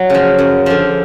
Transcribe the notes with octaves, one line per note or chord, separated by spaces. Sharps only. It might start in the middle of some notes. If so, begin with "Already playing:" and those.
Already playing: F#3
C#3 F3
F#2
D3 F3